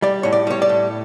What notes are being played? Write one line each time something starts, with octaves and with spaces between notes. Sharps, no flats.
G3 D5
A2 C#5
D5
G3 C#5
D5
A2